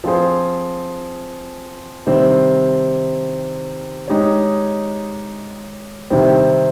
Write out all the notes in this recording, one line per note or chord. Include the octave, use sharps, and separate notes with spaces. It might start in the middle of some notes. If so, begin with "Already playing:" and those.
F3 C4 F4 G#4 C5
C3 D#3 G3 C4
G#3 D#4 G4 C#5
C3 D#3 G3 C4